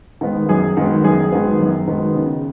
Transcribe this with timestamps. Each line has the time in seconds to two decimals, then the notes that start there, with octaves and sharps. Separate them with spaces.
0.21 D#3 G#3 B3
0.49 F#2 G#4
0.77 D#3 G#3 B3
1.04 F#2 G#4
1.32 D#3 G#3 B3
1.60 F#2
1.88 D#3 G#3 B3
2.15 C#3